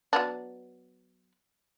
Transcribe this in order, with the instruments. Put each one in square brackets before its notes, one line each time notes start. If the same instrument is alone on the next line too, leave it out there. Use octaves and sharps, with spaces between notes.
[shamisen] F#3 B3 D4